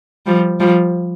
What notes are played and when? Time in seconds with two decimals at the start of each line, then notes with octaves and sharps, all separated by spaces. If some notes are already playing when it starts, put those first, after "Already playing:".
0.26 F3 G3
0.60 F3 G3